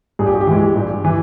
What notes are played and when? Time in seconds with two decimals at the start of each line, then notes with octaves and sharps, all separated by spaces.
0.19 G2 G#4
0.26 G4
0.34 F#4
0.41 G4
0.47 E3 G#3
0.76 G2
1.04 E3